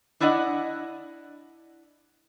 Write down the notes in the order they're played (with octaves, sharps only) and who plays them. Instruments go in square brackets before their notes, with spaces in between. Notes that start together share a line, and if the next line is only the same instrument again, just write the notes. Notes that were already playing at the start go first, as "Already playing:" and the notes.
[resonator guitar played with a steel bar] D4 E4 D5 D#5 F#5